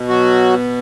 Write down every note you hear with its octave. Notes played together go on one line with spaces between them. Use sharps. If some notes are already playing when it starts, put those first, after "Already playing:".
Already playing: B2
F#3 F#4